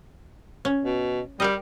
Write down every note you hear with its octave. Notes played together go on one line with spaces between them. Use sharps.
C#4
B2
G3 G4 A#4 D#5